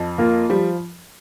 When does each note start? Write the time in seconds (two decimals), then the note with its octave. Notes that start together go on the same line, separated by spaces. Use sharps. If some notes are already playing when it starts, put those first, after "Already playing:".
Already playing: F2 F3
0.18 A#3 F4 A#4
0.50 F3 G3